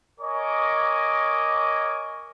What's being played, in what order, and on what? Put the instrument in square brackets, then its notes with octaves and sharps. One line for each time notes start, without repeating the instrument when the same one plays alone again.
[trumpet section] A#4 C#5 D#5 G#5 C#6 D6